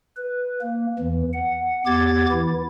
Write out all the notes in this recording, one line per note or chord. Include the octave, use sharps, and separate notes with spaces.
B4
A#3
E2 E3
F#5
E2 B3 G4 D6 G#6 A6
E3 E4